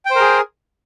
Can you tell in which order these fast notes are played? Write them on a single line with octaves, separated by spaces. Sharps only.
G5 C5 A#4 G#4